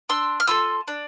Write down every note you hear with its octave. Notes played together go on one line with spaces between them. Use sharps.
D4 C6 E6
F6
F4 A4 C6 E6
D4